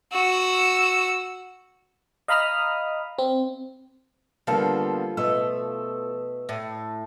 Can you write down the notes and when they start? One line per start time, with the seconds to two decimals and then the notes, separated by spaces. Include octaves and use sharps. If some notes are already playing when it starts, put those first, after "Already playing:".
0.13 F#4 E6
2.28 D#5 F5 A#5 B5 D#6 F6
3.19 C4
4.47 D3 F3 G3 A#3 B3 F4 A4
5.17 B2 A3 D#5 E6
6.49 A2